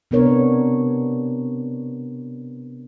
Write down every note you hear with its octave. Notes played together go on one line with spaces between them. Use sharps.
C3 B3 D4 A#4 C#5